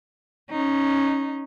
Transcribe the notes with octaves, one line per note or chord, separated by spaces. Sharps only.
C#4 D#4